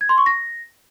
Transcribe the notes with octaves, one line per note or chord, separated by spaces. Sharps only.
G#6
C6
C#6
A#6